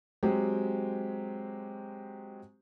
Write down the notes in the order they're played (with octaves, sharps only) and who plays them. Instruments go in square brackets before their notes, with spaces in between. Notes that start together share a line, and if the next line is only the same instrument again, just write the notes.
[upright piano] F#3 G#3 C4 G4 C5